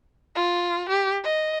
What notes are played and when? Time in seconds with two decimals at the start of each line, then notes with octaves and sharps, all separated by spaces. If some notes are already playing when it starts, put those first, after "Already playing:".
0.35 F4
0.89 G4
1.24 D#5